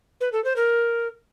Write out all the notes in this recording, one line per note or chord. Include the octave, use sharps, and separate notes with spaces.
B4
A4
C5
A#4